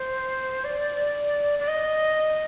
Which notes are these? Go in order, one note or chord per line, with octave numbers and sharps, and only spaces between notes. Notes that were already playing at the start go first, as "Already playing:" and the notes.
Already playing: C5
D5
D5
D#5